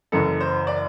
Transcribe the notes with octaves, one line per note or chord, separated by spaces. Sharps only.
F#1 F#2 E3 A4
C5
D5